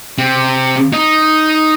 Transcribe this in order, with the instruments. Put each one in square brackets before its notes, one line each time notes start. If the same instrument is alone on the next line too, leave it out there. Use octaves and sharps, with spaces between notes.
[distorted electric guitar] C3 C4
D#4